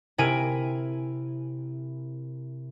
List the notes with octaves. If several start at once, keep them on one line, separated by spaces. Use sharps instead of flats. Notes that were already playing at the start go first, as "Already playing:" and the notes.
C3 E4 A#4 G#5 D7 D#7